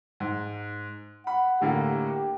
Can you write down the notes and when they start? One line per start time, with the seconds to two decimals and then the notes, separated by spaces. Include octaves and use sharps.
0.20 G#2
1.27 F#5 B5
1.61 A2 D3 A#3 G4